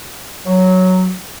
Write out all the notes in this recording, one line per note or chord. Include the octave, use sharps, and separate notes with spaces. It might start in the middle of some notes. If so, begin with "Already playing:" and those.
F#3